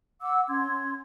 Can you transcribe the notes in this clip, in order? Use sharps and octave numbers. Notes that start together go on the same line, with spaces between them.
F#5 D6 E6
C#4 C6 G#6